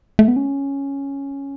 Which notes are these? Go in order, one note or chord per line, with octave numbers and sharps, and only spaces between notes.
A3
B3
C#4